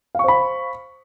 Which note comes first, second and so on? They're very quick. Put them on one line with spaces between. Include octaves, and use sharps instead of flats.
F5 C#6 C5 B5